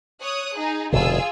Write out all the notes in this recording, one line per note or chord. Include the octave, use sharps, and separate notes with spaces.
C#5 D#6 F#6
D#4 G#4
F1 B2 D3 F4 G#4 E6